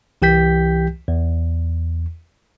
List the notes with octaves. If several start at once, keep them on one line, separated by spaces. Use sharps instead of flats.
C2 E3 G4 G5 G6 B6
E2